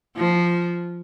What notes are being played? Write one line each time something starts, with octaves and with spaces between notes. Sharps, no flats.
F3